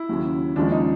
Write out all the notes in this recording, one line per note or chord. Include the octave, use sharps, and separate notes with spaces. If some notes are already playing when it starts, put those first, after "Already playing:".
Already playing: E4
D#2 C#3 F#3
D#2 C#3 F3 G#3 D4
D#4